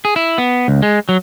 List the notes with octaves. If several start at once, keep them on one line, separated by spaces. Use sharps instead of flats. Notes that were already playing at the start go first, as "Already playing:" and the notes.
G#4
E4
B3
C#2
G#3
F#3